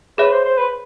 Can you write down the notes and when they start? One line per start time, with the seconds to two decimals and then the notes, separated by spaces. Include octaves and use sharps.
0.18 G#4 B4 C#5 E5
0.32 C5
0.45 C5
0.58 B4